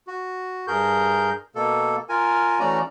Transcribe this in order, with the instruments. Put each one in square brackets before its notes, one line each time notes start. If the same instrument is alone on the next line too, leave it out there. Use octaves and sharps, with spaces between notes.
[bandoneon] F#4
G2 G#4 A#4 G6
B2 A#3 A4
F4 A#4 G#5
E3 A3 C#4 F#4 D5 A#5